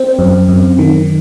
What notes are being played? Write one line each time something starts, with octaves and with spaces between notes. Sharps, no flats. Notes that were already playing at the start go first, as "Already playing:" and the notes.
Already playing: C4
F#2
F#2
D#3